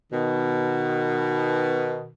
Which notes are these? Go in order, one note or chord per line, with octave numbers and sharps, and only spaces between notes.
B2 D#3